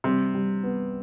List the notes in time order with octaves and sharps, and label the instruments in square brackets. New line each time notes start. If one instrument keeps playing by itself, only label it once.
[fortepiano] C3 [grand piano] G3
[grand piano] G3
B3